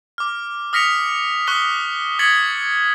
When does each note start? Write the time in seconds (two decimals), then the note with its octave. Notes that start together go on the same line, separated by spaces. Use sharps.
0.18 D6 F6
0.73 D#6 F6 A#6 B6 C#7 F7
1.47 C#6 D#6 F#6 B6 G7
2.19 D#6 G#6 A6 B6 C#7 F#7